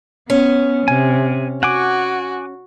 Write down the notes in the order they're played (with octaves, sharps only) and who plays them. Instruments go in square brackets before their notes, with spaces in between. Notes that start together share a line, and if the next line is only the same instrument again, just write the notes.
[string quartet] B3 [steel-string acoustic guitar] C#4
[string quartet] C3 [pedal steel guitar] G#5
[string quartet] F#4 [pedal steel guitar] F#5 G#5 D6